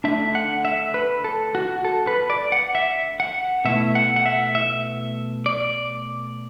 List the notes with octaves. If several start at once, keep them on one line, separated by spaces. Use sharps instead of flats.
D3 A3 D4 E5
F#5
E5
B4
A4
F#4
A4
B4
D5
F#5
E5
F#5
B2 A3 E4 E5
F#5
F#5
E5
E5
D5